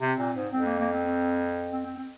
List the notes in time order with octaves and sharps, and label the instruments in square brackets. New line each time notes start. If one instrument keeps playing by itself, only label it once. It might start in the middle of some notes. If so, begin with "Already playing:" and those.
[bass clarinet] C3 [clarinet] C4
[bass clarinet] A#2
G#2
[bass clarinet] F2 [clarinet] C4
[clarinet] A#3
A#3
C4
C4
C4
C4
C4